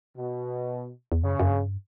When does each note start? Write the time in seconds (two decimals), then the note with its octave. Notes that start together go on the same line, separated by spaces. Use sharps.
0.16 B2
1.12 E2
1.23 F#2 C#3
1.40 F#2
1.49 G2